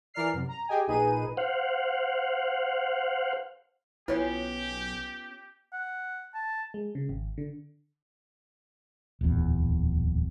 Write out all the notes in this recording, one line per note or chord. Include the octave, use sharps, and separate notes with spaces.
E3 A#4 D5 F6 C7
F#2 C3
A#5
G4 G#4 D#5 G5 G#5
A#1 A#2 D#4 G#4 B4 D#7
C5 F5 F#5
B1 B3 C#4 E4 F4 G4 B4 C#5
F#5
A5
G#3
C#3
G#1
D3
D1 A#1 E2